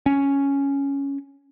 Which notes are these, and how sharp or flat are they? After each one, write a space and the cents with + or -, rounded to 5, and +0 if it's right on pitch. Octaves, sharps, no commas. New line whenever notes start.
C#4 +5